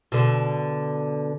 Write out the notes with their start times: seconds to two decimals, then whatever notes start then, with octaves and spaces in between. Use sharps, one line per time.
0.12 B2 D3